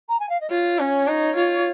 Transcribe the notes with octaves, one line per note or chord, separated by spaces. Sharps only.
A#5
G#5
F5
D#5
F4 C#5
C#4
D#4
F4